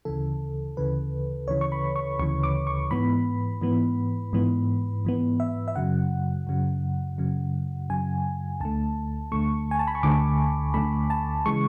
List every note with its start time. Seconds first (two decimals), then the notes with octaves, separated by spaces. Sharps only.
0.05 D2 C#3 E3 A4
0.77 D2 C#3 E3 B4
1.48 D2 C#3 E3 C#5
1.61 C#6
1.72 B5
1.96 C#6
2.19 D2 C#3 E3 C#6
2.43 D6
2.67 C#6
2.91 G#2 E3 B3 B5
3.62 G#2 E3 B3
4.33 G#2 E3 B3
5.05 G#2 E3 B3
5.40 E5
5.68 E5
5.76 F#2 C#3 F#3 F#5
6.47 F#2 C#3 F#3
7.18 F#2 C#3 F#3
7.90 F#2 C#3 F#3 G#5
8.60 D2 D3 A3 A5
9.32 D2 D3 A3 C#6
9.71 G#5
9.79 A5
9.88 B5
9.95 C#6
10.03 D2 D3 A3 D6
10.74 D2 D3 A3 B5
11.10 A5
11.46 C#3 E3 G#3 C#6